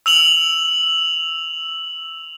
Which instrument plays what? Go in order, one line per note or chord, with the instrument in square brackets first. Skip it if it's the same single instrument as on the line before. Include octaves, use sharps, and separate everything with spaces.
[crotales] E6 F7 F#7